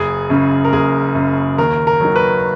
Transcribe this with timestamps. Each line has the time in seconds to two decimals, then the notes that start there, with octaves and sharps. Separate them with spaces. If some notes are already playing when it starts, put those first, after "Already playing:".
Already playing: F#1 G#4
0.30 F#2 C#3
0.65 A#4
0.73 F#1 G#4
1.15 F#2 C#3
1.58 D#2 A#4
1.87 A#4
2.01 D#3 F#3
2.16 B4